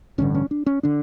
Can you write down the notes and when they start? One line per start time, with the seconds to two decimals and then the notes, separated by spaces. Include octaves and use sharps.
0.18 A1 G2 D3 C#4
0.34 C#4
0.51 D4
0.66 C#4
0.83 D3 D4